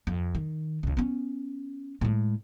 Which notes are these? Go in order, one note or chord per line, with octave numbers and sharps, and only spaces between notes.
F2
D#3
C#2 D3
B3 C#4
A2 G#3